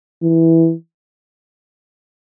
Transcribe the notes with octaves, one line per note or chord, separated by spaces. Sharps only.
E3